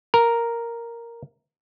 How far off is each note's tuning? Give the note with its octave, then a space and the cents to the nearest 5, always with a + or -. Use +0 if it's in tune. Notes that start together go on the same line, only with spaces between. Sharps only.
A#4 +0 A#5 +0